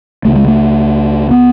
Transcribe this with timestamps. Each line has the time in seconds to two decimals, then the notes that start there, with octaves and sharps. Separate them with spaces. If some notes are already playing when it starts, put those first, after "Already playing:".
0.25 C#2 C#3 A3
0.36 G#3
0.48 A3
1.31 B3